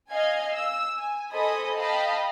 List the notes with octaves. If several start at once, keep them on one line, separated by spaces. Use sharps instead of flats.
D#5 F5 G#5 G#6
E6
G#5
A4 C5 D#5 G#5 B5 D#6
D#5 F5 G5 A5 B5